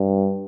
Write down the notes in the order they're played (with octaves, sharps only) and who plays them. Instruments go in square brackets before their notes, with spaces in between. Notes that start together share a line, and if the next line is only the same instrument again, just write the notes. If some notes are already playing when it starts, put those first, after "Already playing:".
Already playing: [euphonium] G2